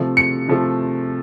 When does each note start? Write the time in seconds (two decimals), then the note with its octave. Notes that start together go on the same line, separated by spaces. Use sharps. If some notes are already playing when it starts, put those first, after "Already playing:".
Already playing: C3 F3 A3
0.17 C#7
0.48 C3 F3 A3